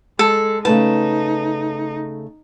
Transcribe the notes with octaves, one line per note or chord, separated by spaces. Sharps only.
G#3 A4
C#3 A3 D#4 B4 A5